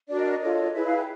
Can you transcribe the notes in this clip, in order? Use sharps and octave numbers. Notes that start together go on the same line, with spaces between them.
D4 F#4 A#4 D5
D#5
D#5
F4 A4 C#5
E4 G#4 B4 E5
F5
G5